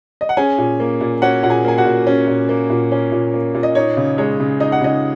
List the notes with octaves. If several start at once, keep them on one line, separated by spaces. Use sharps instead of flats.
D#5
F#5
C#4 G#4 G#5
A#2
A#3
A#2
C#4 F#4 F#5
A#2 F#5
G#4 G#5
A#3 G#5
F#4 F#5
A#2
C#4
A#2
A#3
A#2
C#4
A#2
A#3
A#2
D#5
D#4 C#5
C#3
G#3 C#5
C#3
D#4 D#5
F#5
C#3 D#4 D#5